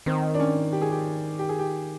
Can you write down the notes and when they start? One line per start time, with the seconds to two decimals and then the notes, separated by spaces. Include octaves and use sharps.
0.06 D#3 C4
0.34 D4
0.40 C#4
0.72 G4
0.82 G#4
0.91 G4
1.39 G4
1.49 G#4
1.59 G4